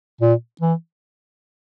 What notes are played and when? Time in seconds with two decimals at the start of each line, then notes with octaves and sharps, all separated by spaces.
0.21 A#2
0.61 E3